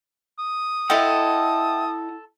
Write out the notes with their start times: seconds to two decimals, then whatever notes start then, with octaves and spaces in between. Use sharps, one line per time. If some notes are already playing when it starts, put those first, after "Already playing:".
0.39 D#6
0.90 E4 A4 D#5 E5 F#5 G5 C6